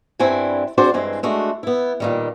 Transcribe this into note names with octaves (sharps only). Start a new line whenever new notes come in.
G2 G3 C4 E4 F#5 G#5
C4 D4 F#4 G#4 C5 D5
G2 E3 G#3 C4
G#3 A3 D4 F#4
B3 E4
A#2 D#3 G3